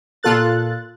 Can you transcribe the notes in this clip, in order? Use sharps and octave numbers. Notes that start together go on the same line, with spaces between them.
A#2 F4 A4 F#6 A6